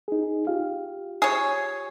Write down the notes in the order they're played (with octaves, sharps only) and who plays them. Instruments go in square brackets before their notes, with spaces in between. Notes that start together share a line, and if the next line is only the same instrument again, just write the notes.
[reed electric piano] D#4 G#4
F4 G4 F5
[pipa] G#4 C#5